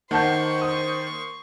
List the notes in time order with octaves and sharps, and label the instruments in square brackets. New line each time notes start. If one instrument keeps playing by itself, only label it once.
[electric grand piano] D#3 A#3 [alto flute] C5 [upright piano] F#5 A5 G6 [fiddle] C6 C#6
[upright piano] D#6